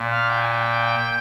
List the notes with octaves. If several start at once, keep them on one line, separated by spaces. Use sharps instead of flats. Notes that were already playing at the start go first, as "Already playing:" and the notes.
Already playing: A#2
F5
G5
G#5
G5